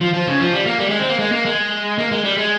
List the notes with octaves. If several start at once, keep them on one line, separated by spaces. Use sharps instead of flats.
F3
F3
C#3
F3
G3
A#3
G3
G#3
C4
A#3
G#3
A#3
G#3
A#3
G#3
G3
G#3